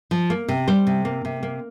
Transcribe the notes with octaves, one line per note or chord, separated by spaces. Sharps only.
F3
A#3
C3
G3 C5
C3
A#3
C3
A#3